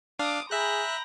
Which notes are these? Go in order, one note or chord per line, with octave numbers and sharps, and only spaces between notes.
D4 F5 D6 D#6
G#4 E5 G5 A#5 B5 F#6